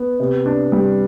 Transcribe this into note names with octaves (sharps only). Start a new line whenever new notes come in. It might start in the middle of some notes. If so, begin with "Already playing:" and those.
Already playing: B3
C3
D4
G3